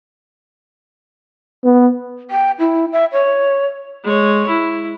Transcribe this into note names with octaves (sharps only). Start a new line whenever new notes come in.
B3
G5
E4
E5
C#5
G#3 C#5
E4